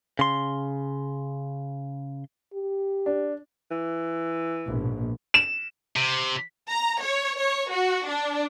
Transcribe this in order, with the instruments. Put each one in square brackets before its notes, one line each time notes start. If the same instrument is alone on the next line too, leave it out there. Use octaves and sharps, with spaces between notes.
[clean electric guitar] C#3 C6
[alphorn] G4
[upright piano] D4
[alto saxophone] E3
[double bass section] A#1 G#2 B2
[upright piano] E7
[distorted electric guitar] C3
[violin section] A#5
C#5
C#5
F#4
D4